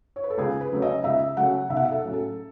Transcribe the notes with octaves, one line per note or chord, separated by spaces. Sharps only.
C#5
B4
A4
C#2 G#4
B4
C#3 F#3 A3 C#4
D#5
C#2 E5
C#3 F#3 A3 C#4 F#5
B1 E5
F#5
E5
A4
A2 F#3 C#4
A4